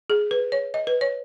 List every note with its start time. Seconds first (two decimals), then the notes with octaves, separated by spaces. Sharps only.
0.10 G#4
0.31 B4
0.52 C#5
0.74 D#5
0.87 B4
1.01 C#5